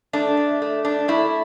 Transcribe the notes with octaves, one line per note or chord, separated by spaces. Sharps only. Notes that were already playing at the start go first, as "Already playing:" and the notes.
A3 D4
A3
A3
D4
A3 E4